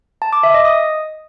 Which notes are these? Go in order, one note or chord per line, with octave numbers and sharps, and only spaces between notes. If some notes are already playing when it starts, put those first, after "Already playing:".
A5
D6
E5
D#5
D#6